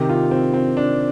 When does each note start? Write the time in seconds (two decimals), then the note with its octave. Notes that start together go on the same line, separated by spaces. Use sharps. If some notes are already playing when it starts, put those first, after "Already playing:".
Already playing: C3 D#3 G4
0.09 F4
0.31 C4
0.54 C4
0.77 D4